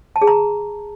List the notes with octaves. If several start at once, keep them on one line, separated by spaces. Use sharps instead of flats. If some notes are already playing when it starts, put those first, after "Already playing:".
A5
G#4
A#5